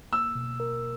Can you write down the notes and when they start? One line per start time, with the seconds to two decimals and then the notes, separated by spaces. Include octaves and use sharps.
0.13 A#3 E6
0.35 B2
0.60 A#4